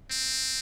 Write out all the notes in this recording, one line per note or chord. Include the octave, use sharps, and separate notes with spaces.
C4